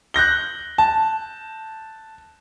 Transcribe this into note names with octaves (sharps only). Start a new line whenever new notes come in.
F#6 G6 A#6 G7
A5